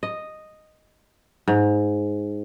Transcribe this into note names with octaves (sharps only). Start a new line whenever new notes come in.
D#5
G#2